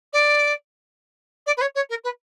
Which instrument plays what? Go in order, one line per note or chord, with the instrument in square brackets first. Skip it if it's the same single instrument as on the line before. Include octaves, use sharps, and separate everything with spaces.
[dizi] D5
D5
B4
C#5
C#5
A#4
B4